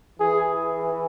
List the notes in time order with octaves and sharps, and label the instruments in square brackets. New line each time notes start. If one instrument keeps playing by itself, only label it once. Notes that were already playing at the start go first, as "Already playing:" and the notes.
[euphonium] E3 [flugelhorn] G#4